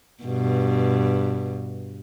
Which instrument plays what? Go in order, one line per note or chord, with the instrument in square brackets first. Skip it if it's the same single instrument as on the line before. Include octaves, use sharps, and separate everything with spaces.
[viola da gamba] G2 B2